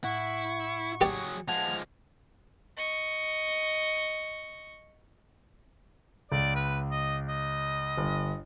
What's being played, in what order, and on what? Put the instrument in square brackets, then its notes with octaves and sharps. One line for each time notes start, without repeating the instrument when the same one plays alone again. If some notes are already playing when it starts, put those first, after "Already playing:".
[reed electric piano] A2 F#5 [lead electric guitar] E4 [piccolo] C#6
[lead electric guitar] F#3 G#4 [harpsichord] G4 D5
[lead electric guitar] F3 G#3 [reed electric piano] F#5 A5 G#6 [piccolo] F7
[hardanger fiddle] D#5 C#6
[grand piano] C#2 [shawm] D5
[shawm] B4
D#5
D#5
[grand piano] G1